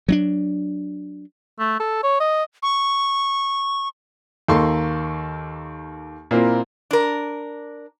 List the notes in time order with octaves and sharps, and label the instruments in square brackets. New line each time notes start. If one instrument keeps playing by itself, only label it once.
[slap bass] F#3 C4 D4
[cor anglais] A3
A4
C#5
D#5
[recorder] C#6
[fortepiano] D#2 A#3 A4 C6 C#6
A#2 A#3 C4 E4 A#4
[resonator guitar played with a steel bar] D4 A#4